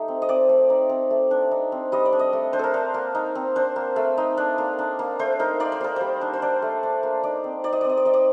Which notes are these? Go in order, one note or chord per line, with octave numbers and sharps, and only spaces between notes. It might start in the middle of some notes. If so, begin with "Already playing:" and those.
Already playing: A3 D#4 G4
C4
D#5
C4 D5
A3
D#4
C4
A3
D4
D#4
C4
G3 D#5
D5
D4
D#5
A3
D4 C5
A4 A#4
D4
A#3
D#4
C4
D4 C5
A#3
A3
D#4
D4
A#3
D4
A#3
A3 C5
D#4 A#4
D#4 D5
C5
A#3 A#4
G3 C5
D4
C5
D4 D5
A3
D4
A#3
D#4 D5
C4
D#4 D5
D#5
C4 D5
D#5
D5
D#4 D#5
D5